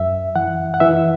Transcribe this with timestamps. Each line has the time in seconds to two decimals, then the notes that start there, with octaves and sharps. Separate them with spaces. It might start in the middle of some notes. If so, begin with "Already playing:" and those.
Already playing: F#2 E5
0.36 E3 F#5
0.74 F#5
0.80 E3 E5